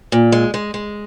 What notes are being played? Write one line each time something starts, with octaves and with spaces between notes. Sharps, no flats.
A#2
G#3
G#3
G#3